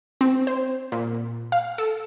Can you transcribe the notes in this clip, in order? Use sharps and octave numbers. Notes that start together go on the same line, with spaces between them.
C4
C5
A#2
F5
A4